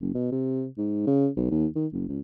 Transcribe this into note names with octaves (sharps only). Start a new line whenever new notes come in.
F#1
B2
C3
G#2
C#3
B1
D#2
D#3
F#1
C#2